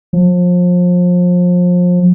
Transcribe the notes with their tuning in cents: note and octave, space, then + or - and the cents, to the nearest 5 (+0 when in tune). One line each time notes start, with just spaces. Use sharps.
F3 +30